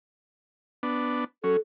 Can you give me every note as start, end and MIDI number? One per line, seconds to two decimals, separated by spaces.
0.83 1.24 59
0.83 1.24 62
1.44 1.57 54
1.44 1.57 61
1.44 1.58 69